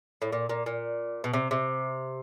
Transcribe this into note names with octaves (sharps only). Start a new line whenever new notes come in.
A2
A#2
A#2
A#2
B2
C3
C3